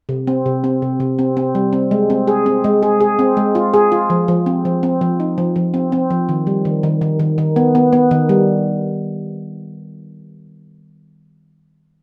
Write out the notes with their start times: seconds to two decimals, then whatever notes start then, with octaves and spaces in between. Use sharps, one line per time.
0.09 C3
0.27 C4
0.46 C3
0.64 C4
0.82 C3
1.00 C3
1.19 C4
1.37 C4
1.55 G3
1.73 C4
1.91 G#3
2.10 C4
2.28 G#4
2.46 C4
2.64 G#3
2.83 G#4
3.00 G#4
3.19 C4
3.37 G#3
3.55 F4
3.74 G#4
3.92 F4
4.10 F3
4.28 F3
4.46 C4
4.65 F3
4.83 C4
5.01 F3
5.20 D#4
5.38 F3
5.56 F3
5.74 C4
5.92 C4
6.10 F3
6.29 D#3
6.47 G3
6.65 D#3
6.83 D#3
7.01 D#3
7.20 D#3
7.38 D#3
7.56 B3
7.75 B3
7.93 B3
8.11 D#3
8.29 G3